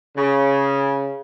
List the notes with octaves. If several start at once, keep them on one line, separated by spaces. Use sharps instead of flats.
C#3